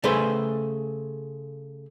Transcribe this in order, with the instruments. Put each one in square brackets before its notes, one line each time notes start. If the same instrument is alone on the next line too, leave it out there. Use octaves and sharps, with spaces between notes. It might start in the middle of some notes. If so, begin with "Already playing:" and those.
[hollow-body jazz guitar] C#3 A3 G#4 B4 C5